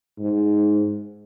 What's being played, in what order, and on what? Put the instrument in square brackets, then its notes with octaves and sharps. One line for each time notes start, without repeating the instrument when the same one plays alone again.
[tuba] G#2